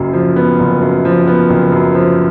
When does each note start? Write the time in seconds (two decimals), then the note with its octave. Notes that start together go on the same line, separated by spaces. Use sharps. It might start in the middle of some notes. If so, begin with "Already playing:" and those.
Already playing: F#1 F#2
0.13 F3
0.36 B3
0.60 F#1
0.81 F#2
1.05 F3
1.27 B3
1.49 F#1
1.72 F#2
1.95 F3